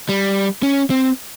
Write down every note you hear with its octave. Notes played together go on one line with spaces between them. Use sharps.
G3
C#4
C4